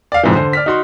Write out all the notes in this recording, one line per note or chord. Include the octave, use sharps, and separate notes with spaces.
D5 F5
F2 G#2 C3 E3
D3 C5
D5 F6 B6
D#4 F#4 C6